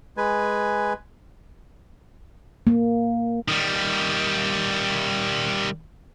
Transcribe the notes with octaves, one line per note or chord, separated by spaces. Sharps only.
G#3 B4 G#5
A#3
D#3 G3